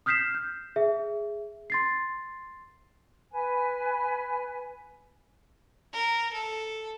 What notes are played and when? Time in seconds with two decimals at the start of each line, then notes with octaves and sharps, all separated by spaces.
0.06 D#6 F6 G6 B6 C7 E7
0.34 G6
0.76 G#4 E5
1.70 C6 A6 C7
3.33 B4 G#5
5.93 A#4
6.33 A4